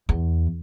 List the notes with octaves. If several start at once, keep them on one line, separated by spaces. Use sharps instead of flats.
E2